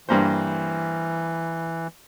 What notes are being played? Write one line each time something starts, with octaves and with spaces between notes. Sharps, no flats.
G2 E3 A#3 C5